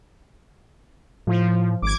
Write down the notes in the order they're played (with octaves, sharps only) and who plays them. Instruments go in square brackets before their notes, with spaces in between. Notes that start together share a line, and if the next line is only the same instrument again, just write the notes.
[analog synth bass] A2 [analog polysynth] F3
[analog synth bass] G#1 [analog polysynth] D6 G#6